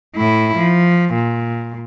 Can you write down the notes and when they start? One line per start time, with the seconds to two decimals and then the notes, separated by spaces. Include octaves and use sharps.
0.16 A2 E4
0.57 F3
1.14 A#2